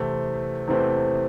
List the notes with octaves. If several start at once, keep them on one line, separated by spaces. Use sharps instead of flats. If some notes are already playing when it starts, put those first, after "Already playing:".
Already playing: E2 C3 E3 A3 C4
E2 C3 E3 A3 C4